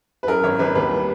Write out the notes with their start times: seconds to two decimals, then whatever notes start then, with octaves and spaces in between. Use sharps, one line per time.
0.23 B4
0.27 F#2 A#4
0.44 G#1 C#5
0.59 G#1 B4
0.75 D#2 B4
0.91 G3